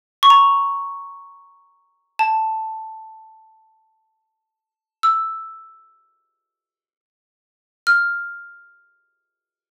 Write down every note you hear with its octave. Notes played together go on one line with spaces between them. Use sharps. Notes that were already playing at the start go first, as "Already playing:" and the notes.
C#6
A#5
A5
E6
F6